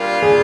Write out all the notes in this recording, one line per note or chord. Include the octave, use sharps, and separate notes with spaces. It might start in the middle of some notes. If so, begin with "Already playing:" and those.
Already playing: A#2 G3 D4 F4 A#4
G#4